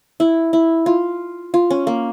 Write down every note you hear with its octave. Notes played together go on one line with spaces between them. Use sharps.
E4
E4
F4
F4
C#4
A#3